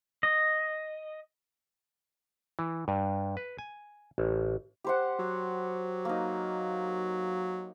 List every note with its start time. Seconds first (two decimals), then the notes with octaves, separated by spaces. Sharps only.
0.23 D#5
2.59 E3
2.88 G2
3.37 B4
3.59 G#5
4.18 A1
4.84 G4 C5 F#5
5.19 F#3
6.05 A#3 D#4